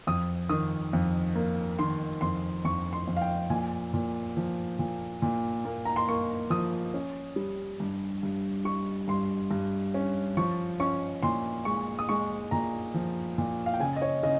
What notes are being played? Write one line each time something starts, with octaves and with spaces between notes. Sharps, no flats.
F2 D#6
D#3 D#6
F2
A#3
D#3 C6
F2 C6
F2 C#6
C6
F2
F5
G5
A#2 G#5
A#2
F3
A#2
A#2
A#3
A#5
C6
A#3 C#6
F3 D#6
C#4
G3
G2
G2
G3 C#6
G2 C6
G2
C#4
F3 C#6
C#4 C#6
A#2 C6
G#3 C#6
D#6
G#3 C#6
A#2 A#5
F3
A#2
F5
G5
C#3 G#5
D#5
C#5
C#3 D#5